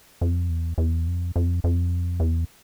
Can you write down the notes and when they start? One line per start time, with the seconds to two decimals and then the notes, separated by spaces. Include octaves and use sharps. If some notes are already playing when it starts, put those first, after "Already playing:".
0.21 F2
0.49 E2
0.78 E2
1.07 F2
1.36 F2
1.64 F2
2.20 E2